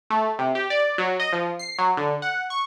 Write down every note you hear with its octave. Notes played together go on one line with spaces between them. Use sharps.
A3
C3
G4
D5
F#3
D#5
F3
C7
F#3
D3
F#5
C#6